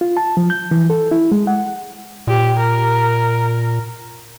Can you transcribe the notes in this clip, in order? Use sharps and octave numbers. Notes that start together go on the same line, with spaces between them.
F4
A5
F3
G6
E3
A4
E4
G#3
F#5
A#2 G4
A#4